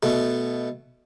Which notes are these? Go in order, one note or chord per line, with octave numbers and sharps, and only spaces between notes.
B2 A3